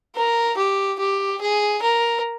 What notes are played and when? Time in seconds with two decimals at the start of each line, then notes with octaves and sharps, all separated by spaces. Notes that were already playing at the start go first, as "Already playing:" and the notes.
0.16 A#4
0.57 G4
1.00 G4
1.41 G#4
1.82 A#4